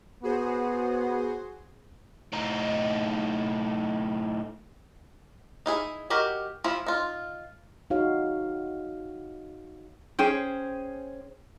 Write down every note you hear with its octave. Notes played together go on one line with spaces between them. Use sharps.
B3 F#4 G#4 C5
A2 D#4
D#4 E4 G#4
F#4 G4 A#4 D#5
F3 E4
D#4 F4
D#4 F#4 G#4 C#5 F5
C#4 G#4 C5 G5